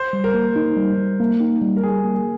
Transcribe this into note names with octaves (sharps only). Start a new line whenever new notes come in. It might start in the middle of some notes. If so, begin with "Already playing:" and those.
Already playing: C5
G3
A#4
A#3
D#4
G3
G3
A#3
D#4
G3
A#4
G3 G#4
A#3
G#4